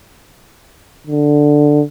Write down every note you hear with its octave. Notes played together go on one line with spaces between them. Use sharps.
D3